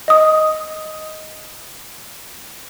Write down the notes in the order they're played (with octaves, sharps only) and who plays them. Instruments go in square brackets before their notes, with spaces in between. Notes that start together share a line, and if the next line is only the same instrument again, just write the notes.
[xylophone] D#5 D#6